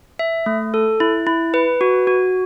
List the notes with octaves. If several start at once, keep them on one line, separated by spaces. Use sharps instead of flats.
E5
A3
A4
E4
E4
B4
F#4
F#4